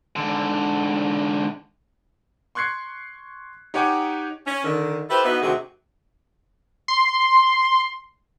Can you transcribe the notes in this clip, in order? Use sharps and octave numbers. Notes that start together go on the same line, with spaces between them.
G#2 D3
C6 C#6 F#6 G#6 C7 C#7
D#4 G4 C#5 F#5 G#5 D6
C#4
D3 D#3
E4 G4 A4 B4 C5
B3 D#4 E4 F#4 B4
D2 C3 D#3 F#4 G#4
C6